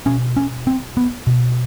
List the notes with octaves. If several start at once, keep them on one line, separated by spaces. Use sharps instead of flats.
B2 C#4
C#4
C4
B3
B2